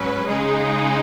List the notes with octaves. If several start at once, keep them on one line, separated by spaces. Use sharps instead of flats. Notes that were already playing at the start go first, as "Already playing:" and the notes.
Already playing: G#2 F#3 C#4 B4
C#3 G#3 D#4 G#4